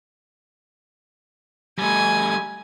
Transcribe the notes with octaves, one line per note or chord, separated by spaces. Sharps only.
G3 A3 G#5